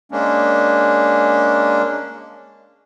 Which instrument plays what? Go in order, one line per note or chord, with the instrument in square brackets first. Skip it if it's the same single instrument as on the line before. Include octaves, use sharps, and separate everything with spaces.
[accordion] G#3 A#3 C#4 D4